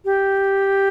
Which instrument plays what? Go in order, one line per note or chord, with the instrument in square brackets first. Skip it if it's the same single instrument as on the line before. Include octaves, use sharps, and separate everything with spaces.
[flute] G4